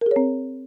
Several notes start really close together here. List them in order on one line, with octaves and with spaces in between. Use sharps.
A#4 G#4 C#5 C4